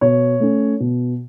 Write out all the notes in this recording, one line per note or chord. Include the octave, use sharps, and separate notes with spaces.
B2 C#5
A3 C#4
B2